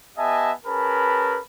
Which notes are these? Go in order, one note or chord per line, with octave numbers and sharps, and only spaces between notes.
B3 G4 D#5 E5 G#5 A5
C#4 G#4 A#4 B4 A5 B5